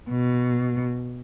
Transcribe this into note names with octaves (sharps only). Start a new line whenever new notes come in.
B2